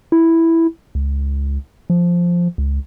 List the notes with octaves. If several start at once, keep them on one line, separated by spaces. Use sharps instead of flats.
E4
C#2
F3
C#2